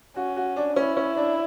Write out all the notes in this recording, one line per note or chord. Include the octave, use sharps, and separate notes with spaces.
C#4 F#4
F#4
D4
C#4 E4
C#4
D4